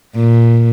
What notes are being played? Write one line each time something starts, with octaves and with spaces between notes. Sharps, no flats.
A#2